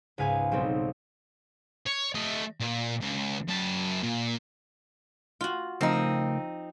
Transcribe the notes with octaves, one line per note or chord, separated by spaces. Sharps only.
C#2 G#2 B4 F5 G#5
B1 G3 C4 D#4
C#5
A3 D#5
A#2
C#2
F#2 A5
A#2
F4 F#4
C#3 F3 A3 C4 D#4 A#4